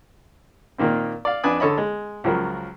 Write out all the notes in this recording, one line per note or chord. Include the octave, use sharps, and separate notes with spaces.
A#2 D#3 A#3 C4
D5 F5
F2 D4 B4 G#5 B5 D#6
D3 A4 C#5 D#5 B5
G#3
C#2 F3 F#3 A#4